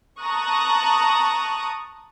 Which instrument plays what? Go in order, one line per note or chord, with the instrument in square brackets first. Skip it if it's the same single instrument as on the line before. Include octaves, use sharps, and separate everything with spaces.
[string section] A5 A#5 C#6 D#6 F#6